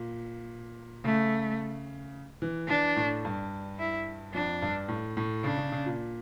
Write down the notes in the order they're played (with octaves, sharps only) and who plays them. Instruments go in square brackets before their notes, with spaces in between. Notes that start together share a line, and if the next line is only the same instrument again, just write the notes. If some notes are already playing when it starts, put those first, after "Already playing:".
Already playing: [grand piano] A#2
[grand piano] C#3 [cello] A3
[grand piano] E3
[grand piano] E3 [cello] D4
[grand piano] A2
G2
[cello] E4
[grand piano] F2 [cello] D4
[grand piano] G2
A2
A2
[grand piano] C#3 [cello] D4
[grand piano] C#3
C#3
A#2